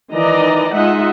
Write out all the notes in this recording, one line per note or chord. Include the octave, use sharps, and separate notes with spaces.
D#3 E3 D5 D#5 A#5
G#3 D#4 F4 D#5 E5 F#5